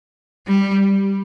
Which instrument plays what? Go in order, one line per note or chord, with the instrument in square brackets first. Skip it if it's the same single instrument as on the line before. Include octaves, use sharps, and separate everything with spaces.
[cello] G3